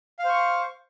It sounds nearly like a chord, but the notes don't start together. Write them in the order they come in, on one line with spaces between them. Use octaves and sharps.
F5 C5 C#6